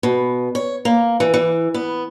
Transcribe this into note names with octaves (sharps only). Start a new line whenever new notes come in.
B2
C#5
A#3
E3
E3
B3